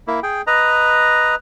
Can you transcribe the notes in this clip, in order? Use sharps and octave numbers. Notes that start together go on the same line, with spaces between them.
A#3 E4
G#4 G5
B4 D#5 A#5